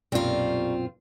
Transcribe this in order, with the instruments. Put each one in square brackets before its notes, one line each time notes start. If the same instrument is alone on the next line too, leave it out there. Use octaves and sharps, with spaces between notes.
[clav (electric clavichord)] B1 F#2 A#2 [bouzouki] G3 A3 A#3 [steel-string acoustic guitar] C4 F4